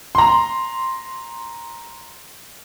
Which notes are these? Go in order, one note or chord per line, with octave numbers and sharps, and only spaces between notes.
A#5 C6